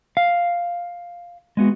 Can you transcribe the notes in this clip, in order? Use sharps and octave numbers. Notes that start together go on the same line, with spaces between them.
F5
G#3 B3 F#4